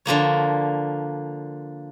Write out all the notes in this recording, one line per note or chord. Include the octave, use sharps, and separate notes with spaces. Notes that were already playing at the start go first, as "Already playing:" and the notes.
D3 F3 A#3 C#5